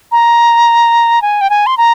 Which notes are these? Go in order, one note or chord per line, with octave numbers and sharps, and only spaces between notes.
A#5
G#5
G5
G#5
C6
A#5